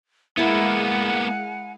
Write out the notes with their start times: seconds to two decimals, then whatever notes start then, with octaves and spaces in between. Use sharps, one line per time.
0.37 G#3 A#3 B3 E4 A#4 F5 F#5 G#5